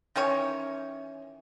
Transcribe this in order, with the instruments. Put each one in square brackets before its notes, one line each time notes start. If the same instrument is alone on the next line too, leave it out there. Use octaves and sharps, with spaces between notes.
[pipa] D#3 E3 C#4 C#5